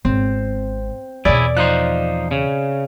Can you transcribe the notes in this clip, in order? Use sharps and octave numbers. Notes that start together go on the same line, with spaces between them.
G#1 C4
E2 B2 E4 G#4 D5
F3 D#4 C5 F#6
C#3